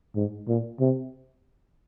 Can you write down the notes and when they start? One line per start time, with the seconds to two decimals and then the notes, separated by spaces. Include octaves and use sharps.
0.15 G#2
0.48 A#2
0.80 C3